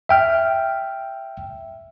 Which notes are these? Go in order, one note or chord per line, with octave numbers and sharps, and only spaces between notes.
E5 G5 F6